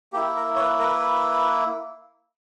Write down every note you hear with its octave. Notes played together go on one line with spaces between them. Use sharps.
A#3 E4 G4
A#4
C#5
B4
A#4
B4